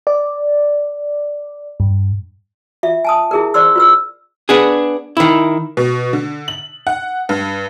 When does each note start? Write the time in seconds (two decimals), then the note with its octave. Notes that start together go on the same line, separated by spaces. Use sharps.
0.07 D5
1.80 G2
2.83 F4 E5
3.05 G#5 A5 D#6
3.31 E4 G#4 A#4
3.54 C5 D5 C6 E6
3.76 F4 B4 E6
4.49 B3 D4 G#4
5.17 D#3 E4
5.77 B2
6.13 D3
6.48 F#7
6.87 F#5
7.29 G2